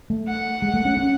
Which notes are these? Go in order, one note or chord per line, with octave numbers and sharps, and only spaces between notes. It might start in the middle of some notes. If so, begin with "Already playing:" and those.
A3
F#5
G#3
A3
C#4
C#4